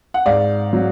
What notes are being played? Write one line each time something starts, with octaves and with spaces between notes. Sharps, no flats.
F#5
G#2 D5 F5
F#3